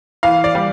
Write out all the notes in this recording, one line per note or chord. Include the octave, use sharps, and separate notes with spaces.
E3 F5
D5
G3